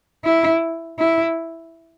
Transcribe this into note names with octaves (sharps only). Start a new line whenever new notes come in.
E4
E4